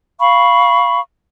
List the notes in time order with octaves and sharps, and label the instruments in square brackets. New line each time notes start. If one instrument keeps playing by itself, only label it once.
[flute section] F5 B5 C#6